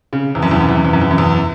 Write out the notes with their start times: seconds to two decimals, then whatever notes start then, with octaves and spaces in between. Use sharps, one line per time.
0.13 C#3
0.35 E2
0.42 F#2
0.51 E2
0.60 F#2
0.69 E2
0.76 F#2
0.85 E2
0.93 F#2
1.02 E2
1.11 F#2
1.18 E2